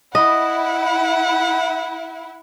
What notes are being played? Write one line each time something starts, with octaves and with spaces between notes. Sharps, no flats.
E4 D#5 F#5